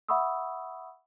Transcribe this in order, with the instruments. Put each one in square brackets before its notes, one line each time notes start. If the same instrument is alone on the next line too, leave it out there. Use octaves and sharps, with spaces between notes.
[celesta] E5 F#5 B5 C#6 D#6 E6